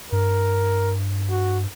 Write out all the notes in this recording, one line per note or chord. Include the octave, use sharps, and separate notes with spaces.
G2 A#4
F#4